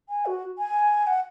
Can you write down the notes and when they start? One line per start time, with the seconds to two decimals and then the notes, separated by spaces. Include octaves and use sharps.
0.09 G#5
0.26 F#4
0.58 G#5
1.07 F#5